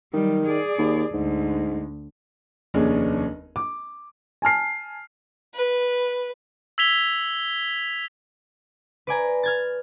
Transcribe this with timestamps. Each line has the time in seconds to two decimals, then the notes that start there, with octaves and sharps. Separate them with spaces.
0.13 D#3 F#3 G3
0.46 G#4 D5
0.78 D#2
1.13 D2 G#2
2.74 F1 D#2 C#4 D4 G#4
3.56 D6
4.42 G#5 A5 F6 C7
5.54 B4
6.78 E6 G#6 B6 F7 G7
9.07 B4 D5 G#5 A#5
9.43 F6 G#6 A6